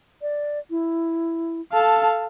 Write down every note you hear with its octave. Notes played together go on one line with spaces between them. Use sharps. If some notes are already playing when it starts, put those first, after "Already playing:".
D5
E4
A4 F5 A5